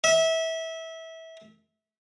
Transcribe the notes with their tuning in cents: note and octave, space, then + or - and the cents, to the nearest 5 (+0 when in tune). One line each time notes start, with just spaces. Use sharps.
E5 -25